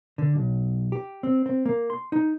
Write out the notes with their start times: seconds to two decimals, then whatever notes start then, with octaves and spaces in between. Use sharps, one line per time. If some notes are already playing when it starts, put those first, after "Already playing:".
0.18 D3
0.35 B1
0.92 G4
1.23 C4
1.46 C4
1.65 A#3
1.90 C6
2.12 D#4